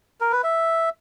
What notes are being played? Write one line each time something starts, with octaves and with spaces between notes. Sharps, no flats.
A#4
B4
E5